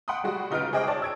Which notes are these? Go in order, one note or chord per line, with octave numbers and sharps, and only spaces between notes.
F#5 G5 B5 C6 D#6
G3 G#3 F#4
C#3 D#4 F4 B4 F6 D7
G#4 C5 D#5 G5 D6
C#5 D5 A5
E6 G#6 D7